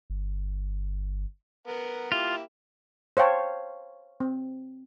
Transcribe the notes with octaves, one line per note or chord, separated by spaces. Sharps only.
G1
B3 A#4 F#5
A#3 E4 F4 G4
C5 C#5 F5 G5 A5
C4